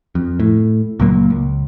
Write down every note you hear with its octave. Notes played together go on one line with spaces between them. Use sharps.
F2
A2
C#2 A#2 F#3 A#3
C#2